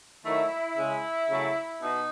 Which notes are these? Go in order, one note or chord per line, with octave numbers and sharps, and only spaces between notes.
D#3 F#3 A3 E4
C#3 G#3
C#3 F#3 A3
B2 D#4